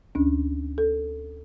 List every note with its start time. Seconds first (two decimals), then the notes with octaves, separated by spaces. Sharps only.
0.15 D2 C#4 D4
0.78 A4